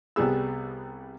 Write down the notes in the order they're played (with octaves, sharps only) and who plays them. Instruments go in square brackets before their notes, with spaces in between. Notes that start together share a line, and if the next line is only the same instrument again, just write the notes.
[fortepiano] C2 G3 B3 G#4 E6